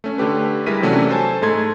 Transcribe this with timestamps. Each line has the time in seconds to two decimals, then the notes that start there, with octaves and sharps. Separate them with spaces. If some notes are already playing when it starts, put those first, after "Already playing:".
0.04 A3 C#4
0.18 D3 A3 G4 B4
0.66 G3 G#3 E4 A#4 B6 D#7
0.82 C3 E3 F#3 A3 C#4 D4
1.09 A4 C5 G#5 A5
1.42 G#2 G#3 A3 A4 C6 G#6